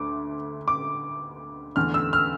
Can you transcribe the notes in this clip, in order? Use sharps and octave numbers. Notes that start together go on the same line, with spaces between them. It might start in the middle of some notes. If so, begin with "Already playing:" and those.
Already playing: D2 D3 A3 D6
D6
E2 D3 A3 F6
E6
F6